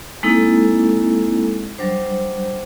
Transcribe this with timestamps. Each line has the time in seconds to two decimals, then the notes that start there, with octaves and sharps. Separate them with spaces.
0.23 G#3 A#3 C4 D#4 E4 A4
1.78 F#3 G3 D4 C5